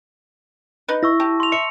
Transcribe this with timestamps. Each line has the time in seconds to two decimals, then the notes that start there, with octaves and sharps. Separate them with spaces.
0.88 D#4 B4
1.03 E4 C#6 E6 A#6
1.20 G4 A5
1.40 C6 F7
1.52 E5 C#7